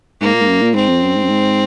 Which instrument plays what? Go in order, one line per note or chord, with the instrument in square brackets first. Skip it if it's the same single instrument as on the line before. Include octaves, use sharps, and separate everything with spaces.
[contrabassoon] G#2 [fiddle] A#3
[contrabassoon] A#2
G#2
F#2
A#2
[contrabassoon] G#2 [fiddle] C4
[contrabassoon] F2
F#2
G#2
F#2
G#2